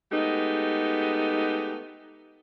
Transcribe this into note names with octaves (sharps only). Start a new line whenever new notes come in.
G#3 A3 B3 D#4 G4